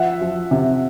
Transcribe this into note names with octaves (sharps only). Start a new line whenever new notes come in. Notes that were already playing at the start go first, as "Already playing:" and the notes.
Already playing: F3 E5 F#5
F3
C3